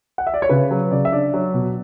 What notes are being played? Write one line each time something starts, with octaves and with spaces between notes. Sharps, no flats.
F#5
E5
D5
C#5
C#3 B4
F#3
C#3 D5
E5
D4 D5
F#3
B2